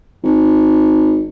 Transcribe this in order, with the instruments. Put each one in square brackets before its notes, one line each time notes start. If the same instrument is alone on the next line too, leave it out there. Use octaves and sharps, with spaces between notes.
[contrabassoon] G#1